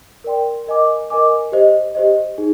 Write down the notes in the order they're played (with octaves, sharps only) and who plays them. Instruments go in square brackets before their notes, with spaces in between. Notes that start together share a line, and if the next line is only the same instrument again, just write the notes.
[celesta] A#4 D5 G5 C6
A#4 D#5 G#5 D6
A#4 D#5 G#5 D6
G4 C5 D#5
G4 C5 D#5
D#4 G#4